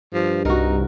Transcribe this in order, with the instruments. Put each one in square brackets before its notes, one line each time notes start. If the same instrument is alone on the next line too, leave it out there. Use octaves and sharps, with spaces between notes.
[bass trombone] G2 [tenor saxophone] F3
[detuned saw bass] C2 [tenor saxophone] D#4 [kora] F#4 A#4